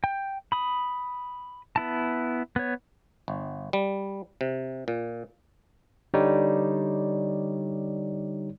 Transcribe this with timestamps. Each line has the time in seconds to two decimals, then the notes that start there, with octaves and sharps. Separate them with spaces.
0.04 G5
0.52 B5 D#6
1.76 B3 E4 A5
2.56 B3 C#5
3.28 G1
3.73 G3
4.41 C3
4.88 A#2
6.14 D3 G3 D#4 C#5 D5